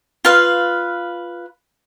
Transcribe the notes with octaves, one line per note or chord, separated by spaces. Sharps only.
F4 B4 F5